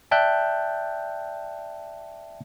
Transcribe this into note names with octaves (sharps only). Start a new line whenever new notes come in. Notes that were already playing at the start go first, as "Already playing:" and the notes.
D5 E5 G5 A5 F#6 G6